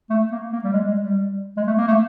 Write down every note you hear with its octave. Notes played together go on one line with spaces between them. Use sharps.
A3
A#3
A#3
G3
G#3
G#3
G3
G#3
A3
A#3
A3